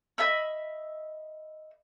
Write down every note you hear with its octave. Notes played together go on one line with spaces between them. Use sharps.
D#5 E5 B5 E6